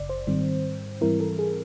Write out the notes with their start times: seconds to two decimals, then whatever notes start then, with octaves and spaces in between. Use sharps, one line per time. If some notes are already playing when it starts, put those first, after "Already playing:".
Already playing: G1 F#2 C#3 D5
0.09 C5
0.27 G#2 D#3 G3 C4
1.01 G#2 E3 G3 C4 E4 A#4
1.20 A4
1.39 G#4